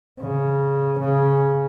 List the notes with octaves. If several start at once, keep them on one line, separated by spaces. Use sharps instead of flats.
C#3
C#3